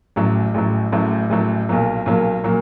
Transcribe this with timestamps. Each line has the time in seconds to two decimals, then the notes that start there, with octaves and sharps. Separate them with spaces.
0.16 A1 A2 F#3
0.54 A1 A2 F#3
0.92 A1 A2 F#3
1.30 A1 A2 F#3
1.68 B1 A#2 F#3 A#3
2.06 B1 A#2 F#3 A#3
2.44 A#2 F#3 A#3